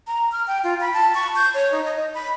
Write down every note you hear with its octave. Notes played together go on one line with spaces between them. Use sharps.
A#5
F6
G5
F4
B5
A5
C#6
G6
C#5
D#4
D#5
B5